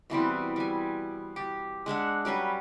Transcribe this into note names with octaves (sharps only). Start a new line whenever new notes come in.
B2 E3 G3 C4
G3 G#5
G4
G#3 D4 E5 F#5
F#3 G3 C#4 B4